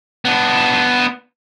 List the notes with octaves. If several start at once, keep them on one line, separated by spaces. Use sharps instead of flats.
B3 D4